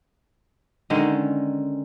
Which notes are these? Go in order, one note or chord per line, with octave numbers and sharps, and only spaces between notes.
D3 D#3 G#3 C#4